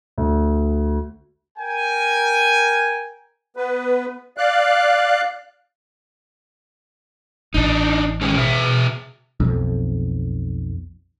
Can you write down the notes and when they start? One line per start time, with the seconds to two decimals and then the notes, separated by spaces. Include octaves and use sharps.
0.18 D2
1.59 A#4 G5 G#5
3.57 B3 B4
4.37 D5 F5 F#6
7.54 A1 D4 D#4
8.21 D#3 G#3 C#4
8.36 B2 G#4 E5
9.40 B1 F2